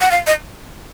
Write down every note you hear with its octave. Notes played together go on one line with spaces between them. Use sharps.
F#5
F5
D#5